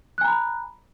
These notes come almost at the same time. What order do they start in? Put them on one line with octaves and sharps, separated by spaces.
F#6 G#5 A#5 B5